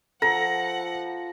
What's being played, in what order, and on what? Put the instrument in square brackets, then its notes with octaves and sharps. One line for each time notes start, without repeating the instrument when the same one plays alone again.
[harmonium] F3 [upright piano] A4 [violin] F#5 [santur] A#5